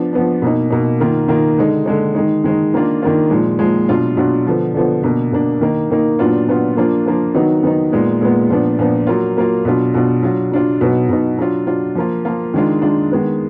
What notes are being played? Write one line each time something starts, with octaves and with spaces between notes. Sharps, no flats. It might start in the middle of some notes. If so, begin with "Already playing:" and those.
Already playing: F3 B3 D4
F3 B3 D4
B2 A#3 D#4
B2 A#3 D#4
D#3 A#3 F4
D#3 A#3 F4
D3 G#3 D#4
D3 G#3 D#4
D#3 G#3 D#4
D#3 G#3 D#4
D#3 A#3 D4 F4
D#3 A#3 D4 F4
A#2 F3 G#3
A#2 F3 G#3
B2 F#3 D4 F4
B2 F#3 D4 F4
D3 F3 B3
D3 F3 B3
B2 A#3 D4
B2 A#3 D4
D#3 A#3 D#4
D#3 A#3 D#4
A#2 F#3 B3 D4 F4
A#2 F#3 B3 D4 F4
F3 A#3 D4 F4
F3 A#3 D4 F4
D#3 F#3 B3 D#4
D#3 F#3 B3 D#4
A#2 G#3 B3
A#2 G#3 B3
A#2 F3 B3 D4
A#2 F3 B3 D4
F#3 A#3 F4
F#3 A#3 F4
B2 F#3 D4 F4
B2 F#3 D4 F4
F#3 D4 F4
F#3 D4 F4
B2 F#3 B3 D#4
B2 F#3 B3 D#4
F#3 D4 F4
F#3 D4 F4
F3 A#3 F4
F3 A#3 F4
D#3 G#3 D4 F4
D#3 G#3 D4 F4
D#3 G#3 B3